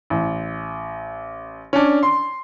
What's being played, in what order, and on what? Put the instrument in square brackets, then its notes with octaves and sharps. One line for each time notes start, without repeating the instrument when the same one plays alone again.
[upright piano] A1
C#4 D4
C6